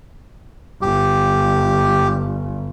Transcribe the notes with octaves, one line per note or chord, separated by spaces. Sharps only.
G1 G4